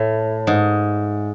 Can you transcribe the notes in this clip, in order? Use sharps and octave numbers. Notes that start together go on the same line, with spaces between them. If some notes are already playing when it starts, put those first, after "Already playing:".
Already playing: A2
G#2